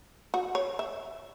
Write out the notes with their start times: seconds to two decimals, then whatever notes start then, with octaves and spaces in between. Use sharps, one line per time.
0.34 F#4
0.55 C#5
0.79 E5